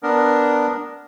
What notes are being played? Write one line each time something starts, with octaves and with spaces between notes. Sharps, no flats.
B3 D4 A#4